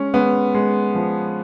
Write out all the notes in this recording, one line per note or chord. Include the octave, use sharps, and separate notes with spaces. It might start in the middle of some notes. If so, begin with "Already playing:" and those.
Already playing: G#3 C#4
G#3 B3
G#3
F3